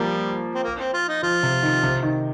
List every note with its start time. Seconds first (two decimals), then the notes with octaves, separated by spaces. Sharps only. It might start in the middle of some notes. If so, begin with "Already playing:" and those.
Already playing: F3 G3 A#3
0.55 C4
0.64 A#3
0.79 C4
0.94 F4
1.09 D#4
1.23 F3 F4
1.43 C3
1.63 D#3
1.83 C3
2.03 D#3